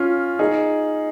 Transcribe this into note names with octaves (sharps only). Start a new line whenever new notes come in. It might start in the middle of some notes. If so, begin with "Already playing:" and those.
Already playing: C#4 F4
D#4 G#4